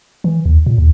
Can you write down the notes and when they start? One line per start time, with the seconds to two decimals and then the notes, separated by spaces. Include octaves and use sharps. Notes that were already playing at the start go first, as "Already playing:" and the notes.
0.24 E3
0.46 D#2
0.66 A#2
0.78 D#2